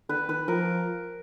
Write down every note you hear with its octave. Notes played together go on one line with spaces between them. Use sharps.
D3 B4
D#3 B4
F3 A#4